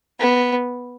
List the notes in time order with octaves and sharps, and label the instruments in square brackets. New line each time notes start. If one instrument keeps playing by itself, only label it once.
[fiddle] B3